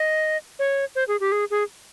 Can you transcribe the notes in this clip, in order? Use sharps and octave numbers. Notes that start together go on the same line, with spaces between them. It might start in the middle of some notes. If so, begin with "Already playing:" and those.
Already playing: D#5
C#5
C5
G#4
G4
G#4
G#4